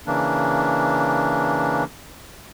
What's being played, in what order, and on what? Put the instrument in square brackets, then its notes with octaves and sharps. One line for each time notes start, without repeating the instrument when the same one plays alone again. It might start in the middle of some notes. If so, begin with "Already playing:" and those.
[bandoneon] C#3 E3 A#3 D4